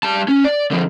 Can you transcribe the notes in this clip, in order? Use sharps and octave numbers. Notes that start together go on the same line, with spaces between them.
G3 A5
C#4
D5
D3 F3